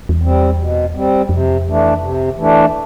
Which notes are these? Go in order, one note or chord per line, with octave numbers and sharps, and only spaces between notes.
E2
G3 C4
B2
G3 C4
F2 C3
E3 A3 D4
C3
E3 A3 D4